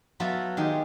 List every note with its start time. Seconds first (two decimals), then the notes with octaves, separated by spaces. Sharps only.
0.20 F#3 B3 F4 A4 E5
0.57 D#3 G#3 G4